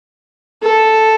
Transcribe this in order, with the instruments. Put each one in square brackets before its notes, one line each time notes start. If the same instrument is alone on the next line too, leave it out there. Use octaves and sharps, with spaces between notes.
[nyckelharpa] A4